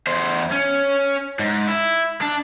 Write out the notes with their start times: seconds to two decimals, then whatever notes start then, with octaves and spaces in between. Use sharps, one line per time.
0.07 E2 C5
0.51 C#4
1.39 G#2
1.68 E4
2.21 D4